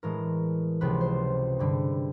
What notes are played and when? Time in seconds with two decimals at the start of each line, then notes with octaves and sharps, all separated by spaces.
0.03 A2 E3 G#3 A#4
0.81 C#2 C3 F3 G#3 B4
1.01 C5
1.59 G2 D3 G3